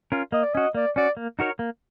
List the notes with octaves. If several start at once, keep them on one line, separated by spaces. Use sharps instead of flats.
C#4 F4 A#4
A#3 D#5
D5
C#4 F#4 D#5
A#3 D5
C#4 F#4 D5
A#3
D#4 F#4 A#4 C#5
A#3